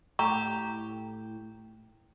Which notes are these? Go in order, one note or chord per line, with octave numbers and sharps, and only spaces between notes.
A2 G4 A#5 C#6